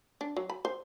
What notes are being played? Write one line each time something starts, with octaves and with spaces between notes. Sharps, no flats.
D4
F#3
B5
C5